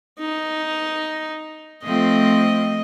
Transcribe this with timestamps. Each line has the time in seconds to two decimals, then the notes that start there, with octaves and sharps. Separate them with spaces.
0.20 D#4
1.84 F3 A3 C4 D#5